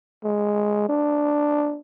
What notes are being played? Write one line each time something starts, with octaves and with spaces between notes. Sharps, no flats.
G#3
D4